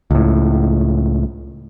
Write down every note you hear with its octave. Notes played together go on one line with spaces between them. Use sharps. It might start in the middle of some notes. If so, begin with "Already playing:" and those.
C#2 A2